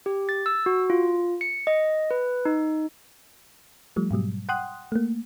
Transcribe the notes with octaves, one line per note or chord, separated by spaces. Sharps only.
G4
A6
E6
F#4
F4
C#7
D#5
B4
D#4
F3 G3 A3
G#2 B2 F#3 G3
F#5 G5 C6 D#6 F#6
A3 A#3